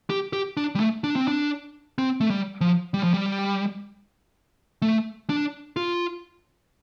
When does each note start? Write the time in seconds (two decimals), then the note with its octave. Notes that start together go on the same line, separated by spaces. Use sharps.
0.10 G4
0.33 G4
0.57 D4
0.75 G3
0.80 A3
1.04 D4
1.16 C4
1.28 D4
1.98 C4
2.21 A3
2.30 G3
2.61 F3
2.94 G3
3.03 F3
3.14 G3
4.82 A3
5.30 D4
5.77 F4